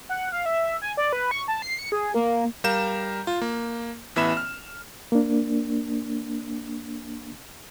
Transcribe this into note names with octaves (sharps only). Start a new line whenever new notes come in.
F#5
F5
E5
G#5
D5
B4
C#6
A5
C7
C#7
G#4
A#3
G3 A#4 F5 A#5 G6 E7
F4
A#3
A1 E3 B3 E5 B5 E7
F6
A#3 D4